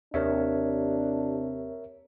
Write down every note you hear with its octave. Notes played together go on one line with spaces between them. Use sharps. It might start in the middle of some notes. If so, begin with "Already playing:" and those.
D#2 C3 D4 A#4 C#5 E5